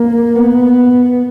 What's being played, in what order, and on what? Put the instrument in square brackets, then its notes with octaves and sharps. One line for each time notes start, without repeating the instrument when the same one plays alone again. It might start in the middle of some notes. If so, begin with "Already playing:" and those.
Already playing: [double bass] A#3
B3